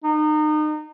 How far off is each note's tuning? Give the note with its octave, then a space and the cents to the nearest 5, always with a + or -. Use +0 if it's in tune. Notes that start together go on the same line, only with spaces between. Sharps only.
D#4 -30